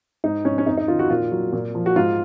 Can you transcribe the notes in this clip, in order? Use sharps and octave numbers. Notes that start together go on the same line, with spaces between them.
G#2 D#4
G#2 C#4
C#4
F2 D#4
D#4
D#3 F4
F#4
A#2 F4
F#3
A#2
F3
F#4
G#2 F4